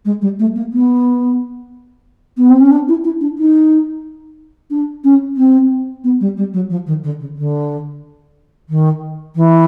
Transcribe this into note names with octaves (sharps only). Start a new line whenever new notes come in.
G#3
G3
A3
A#3
B3
B3
C4
C#4
D4
E4
E4
D4
D#4
D4
C#4
C4
B3
G3
G3
F#3
F3
D#3
D3
C#3
D3
D#3
E3